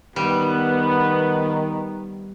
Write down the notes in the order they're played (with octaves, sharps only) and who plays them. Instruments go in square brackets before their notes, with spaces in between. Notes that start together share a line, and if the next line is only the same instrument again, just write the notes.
[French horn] D#3 [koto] G3 [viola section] B3 [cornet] B4